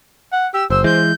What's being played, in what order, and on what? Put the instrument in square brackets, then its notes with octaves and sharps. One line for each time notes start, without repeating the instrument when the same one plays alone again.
[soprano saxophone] F#5
[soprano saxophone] G4 [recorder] E6
[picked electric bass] F#1 [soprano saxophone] C5 [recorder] E6
[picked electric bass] E3 G#3 [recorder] G6